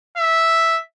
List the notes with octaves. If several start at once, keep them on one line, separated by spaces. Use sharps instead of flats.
E5